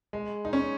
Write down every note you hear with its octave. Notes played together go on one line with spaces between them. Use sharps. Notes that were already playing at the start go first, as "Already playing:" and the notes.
G#3
D#4
C#4